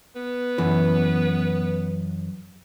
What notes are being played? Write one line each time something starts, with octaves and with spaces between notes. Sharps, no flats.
B3
F#2 E3